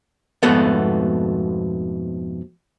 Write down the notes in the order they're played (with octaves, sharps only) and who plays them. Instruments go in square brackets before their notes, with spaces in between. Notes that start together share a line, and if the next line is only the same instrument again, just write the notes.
[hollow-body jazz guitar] F2 G#2 B2 A3 B3